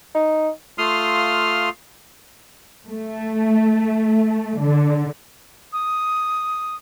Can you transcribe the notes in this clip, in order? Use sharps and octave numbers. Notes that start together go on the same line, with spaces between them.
D#4
A3 F4 F5 C6 D#6 F6
A3
D3
D#6